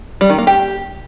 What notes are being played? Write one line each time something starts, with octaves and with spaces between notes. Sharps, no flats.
G3
D#3
A#3
G4